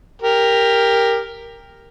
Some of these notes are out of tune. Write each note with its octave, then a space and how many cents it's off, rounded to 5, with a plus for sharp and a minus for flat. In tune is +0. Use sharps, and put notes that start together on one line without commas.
G4 +15 A#4 +0